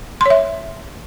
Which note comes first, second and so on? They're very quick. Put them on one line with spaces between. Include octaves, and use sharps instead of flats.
C6 C#5 E5